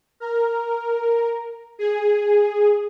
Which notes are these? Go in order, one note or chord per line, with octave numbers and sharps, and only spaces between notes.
A#4
G#4